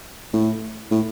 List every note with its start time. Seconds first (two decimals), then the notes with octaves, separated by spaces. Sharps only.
0.33 A2
0.91 A2